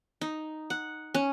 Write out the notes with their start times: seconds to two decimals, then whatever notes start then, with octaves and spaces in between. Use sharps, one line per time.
0.21 D#4
0.70 F#5
1.14 C#4